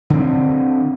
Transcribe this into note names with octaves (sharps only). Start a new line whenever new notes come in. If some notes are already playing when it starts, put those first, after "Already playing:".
D3 C4